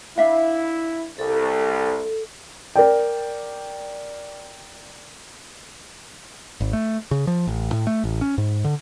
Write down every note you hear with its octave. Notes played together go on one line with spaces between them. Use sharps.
D4 E4 E5 F5
C2 A4
A#4 D5 G5
G#1
A3
C#3
F3
A1
A2
A3
A1
C#4
G#2
D3